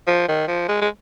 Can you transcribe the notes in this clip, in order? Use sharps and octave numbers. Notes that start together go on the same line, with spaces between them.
F3
D#3
F3
G#3
G#3